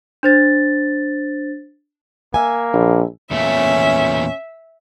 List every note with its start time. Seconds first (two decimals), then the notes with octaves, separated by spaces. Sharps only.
0.23 D4 C5 A6
2.34 A#3 E5 G#5
2.73 A#1
3.31 E2 A#2 A3 C#4 E5